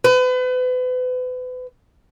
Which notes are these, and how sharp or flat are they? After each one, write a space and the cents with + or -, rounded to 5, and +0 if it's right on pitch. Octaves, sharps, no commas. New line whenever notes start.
B4 +35